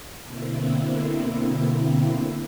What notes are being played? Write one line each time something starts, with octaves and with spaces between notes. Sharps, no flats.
B2 D3 A#3 C4 E4